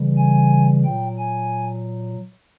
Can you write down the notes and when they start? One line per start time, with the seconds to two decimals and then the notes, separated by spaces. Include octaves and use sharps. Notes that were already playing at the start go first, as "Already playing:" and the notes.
Already playing: C#3 E3 G3
0.18 G#5
0.85 A#2 F#3 G5
1.18 G#5